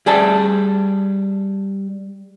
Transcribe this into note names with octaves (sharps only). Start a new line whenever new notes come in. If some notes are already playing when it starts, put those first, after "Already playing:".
G3 G#4 G5 A5